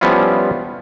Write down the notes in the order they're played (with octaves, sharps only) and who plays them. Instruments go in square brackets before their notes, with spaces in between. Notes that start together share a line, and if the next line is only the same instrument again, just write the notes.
[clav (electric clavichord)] F3 G3 B3 C#4 E4 F4